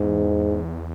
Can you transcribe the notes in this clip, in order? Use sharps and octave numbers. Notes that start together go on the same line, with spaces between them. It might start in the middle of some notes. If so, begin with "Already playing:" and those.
Already playing: E2 G#2